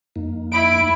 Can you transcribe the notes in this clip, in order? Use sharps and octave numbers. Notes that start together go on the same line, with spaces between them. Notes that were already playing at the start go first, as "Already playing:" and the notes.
F2 A#3 D#4
E4 B5 D7